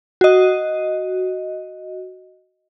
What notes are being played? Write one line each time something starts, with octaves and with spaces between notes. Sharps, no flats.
F#4 D#5